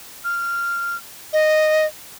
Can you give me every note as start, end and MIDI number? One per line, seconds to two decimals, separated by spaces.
0.24 0.96 89
1.33 1.86 75